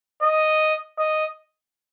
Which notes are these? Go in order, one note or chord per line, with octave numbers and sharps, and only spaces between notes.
D#5
D#5